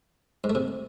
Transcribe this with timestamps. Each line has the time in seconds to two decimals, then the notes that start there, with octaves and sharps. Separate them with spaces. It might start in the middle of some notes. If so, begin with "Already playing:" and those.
0.44 G#2
0.50 A3
0.55 C3